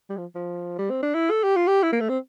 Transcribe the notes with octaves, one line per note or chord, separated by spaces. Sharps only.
G3
F3
F3
G3
C4
D4
E4
A4
G4
F4
G4
E4
A#3
A3
C4